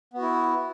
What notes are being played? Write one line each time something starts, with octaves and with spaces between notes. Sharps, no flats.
B3 E4 F#4